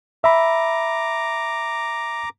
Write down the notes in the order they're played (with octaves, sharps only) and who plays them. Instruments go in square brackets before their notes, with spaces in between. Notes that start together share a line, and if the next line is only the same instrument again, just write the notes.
[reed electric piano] E5 B5 [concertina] A#5 D6